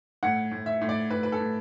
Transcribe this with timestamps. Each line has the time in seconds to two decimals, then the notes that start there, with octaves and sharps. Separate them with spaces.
0.23 A2 F#5
0.52 A2
0.66 E5
0.81 A2
0.89 D5
1.10 A2 B4
1.23 B4
1.32 A4
1.40 A2